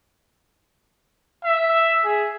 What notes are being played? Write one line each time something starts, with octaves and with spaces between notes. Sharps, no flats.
E5
G#4